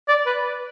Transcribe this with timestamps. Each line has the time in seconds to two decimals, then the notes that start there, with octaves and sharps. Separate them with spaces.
0.08 D5
0.26 B4